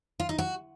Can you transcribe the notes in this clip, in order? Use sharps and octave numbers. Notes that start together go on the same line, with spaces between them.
F4
D#4
F#4